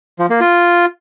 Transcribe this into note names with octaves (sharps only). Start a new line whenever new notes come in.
F3
A#3
F4